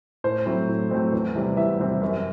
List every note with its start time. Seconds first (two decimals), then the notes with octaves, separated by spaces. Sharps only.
0.24 A2 C5
0.46 F#3 A3 C4 E4
0.68 A2
0.90 F#3 A3 C4 E4
1.13 E2
1.35 C3 E3 G3 C4
1.57 E2 E5
1.79 C3 E3 G3 C4
2.01 F#2